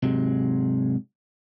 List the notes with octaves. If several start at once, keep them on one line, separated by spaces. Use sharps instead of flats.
G#2 C3 F#3 G#3